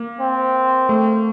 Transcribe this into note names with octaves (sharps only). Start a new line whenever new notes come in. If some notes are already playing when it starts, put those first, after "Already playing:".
Already playing: A#3
C4
A3